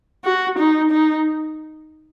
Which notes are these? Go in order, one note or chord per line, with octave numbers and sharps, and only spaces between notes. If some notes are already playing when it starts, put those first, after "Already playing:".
F#4
D#4
D#4